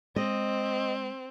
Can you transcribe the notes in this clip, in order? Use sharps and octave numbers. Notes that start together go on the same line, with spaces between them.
G#3 C4 D#5